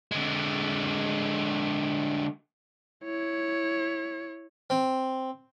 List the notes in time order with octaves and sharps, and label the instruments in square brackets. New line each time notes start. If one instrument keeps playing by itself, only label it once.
[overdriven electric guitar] D3 G#3
[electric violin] E4 C#5
[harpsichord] C4